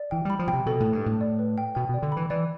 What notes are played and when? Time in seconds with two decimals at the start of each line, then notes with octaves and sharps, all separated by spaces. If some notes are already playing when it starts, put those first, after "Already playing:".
Already playing: D5
0.11 E3 G5
0.25 G3
0.30 B5
0.39 F3
0.47 B2 G5
0.53 C3
0.66 B2 A4
0.80 A2 A4
0.93 G2
1.03 A2 G5
1.21 D5
1.39 B4
1.58 G5
1.75 B2 G5
1.89 B2
1.94 D5
2.02 D3
2.12 E3 B5
2.30 E3 D5